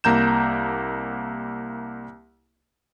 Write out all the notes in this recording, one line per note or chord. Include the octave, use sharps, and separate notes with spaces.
C2 A#3 A#5 G6 E7